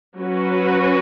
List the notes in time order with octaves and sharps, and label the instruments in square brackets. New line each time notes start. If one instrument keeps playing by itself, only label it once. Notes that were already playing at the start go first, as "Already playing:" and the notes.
[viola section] F#3 C#4 F#4 B4